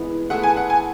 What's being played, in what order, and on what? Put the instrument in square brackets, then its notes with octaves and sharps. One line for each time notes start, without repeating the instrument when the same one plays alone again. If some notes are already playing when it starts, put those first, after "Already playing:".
Already playing: [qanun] E3 G#3 B3
[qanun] A3 E4 G#4 B4 [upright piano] F#5
[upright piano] G#5
F#5
G#5